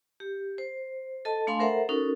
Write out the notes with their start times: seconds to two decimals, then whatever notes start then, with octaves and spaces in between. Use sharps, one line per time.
0.20 G4
0.58 C5
1.25 A4 D#5 A5
1.47 A3 D4 F5 G#5 B5 C6
1.59 A4 A#4 C5 E5 F#5 A#5
1.89 C#4 D#4 F#4 A4 A#4